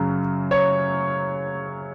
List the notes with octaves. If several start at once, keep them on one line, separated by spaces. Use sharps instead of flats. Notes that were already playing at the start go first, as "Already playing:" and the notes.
Already playing: F#2 C#3 F#3
C#5